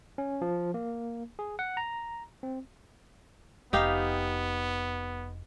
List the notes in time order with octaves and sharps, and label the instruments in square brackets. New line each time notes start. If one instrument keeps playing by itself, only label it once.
[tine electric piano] C#4
F3
A#3
G#4
F#5
A#5
C4
[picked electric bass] F1 [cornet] B3 [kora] D#4 G4 F5